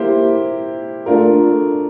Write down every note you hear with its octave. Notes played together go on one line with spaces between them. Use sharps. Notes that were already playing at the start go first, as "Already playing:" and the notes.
Already playing: A#3 E4 G4 C5
A3 D4 F4 A#4